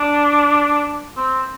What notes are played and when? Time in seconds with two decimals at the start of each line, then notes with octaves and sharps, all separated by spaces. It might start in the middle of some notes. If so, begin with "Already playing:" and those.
Already playing: D4
1.17 C4